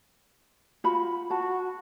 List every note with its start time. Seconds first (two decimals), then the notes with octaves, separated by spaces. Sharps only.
0.84 F4 F#4 B5
1.30 F#4 A5